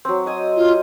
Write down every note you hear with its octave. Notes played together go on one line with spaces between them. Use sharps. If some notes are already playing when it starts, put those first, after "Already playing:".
F#3 C4
D#5 G#5 D#6
F4